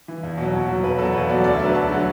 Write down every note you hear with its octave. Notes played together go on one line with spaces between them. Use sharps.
E3
E2
B2
F#3
E2
B2 F#3
E2 B4
B2 F#3 A4
E2 B4
B2 F#3 D5
D2 D5
E5
D3 F#3 D5
B4
D2 A5
D3 F#3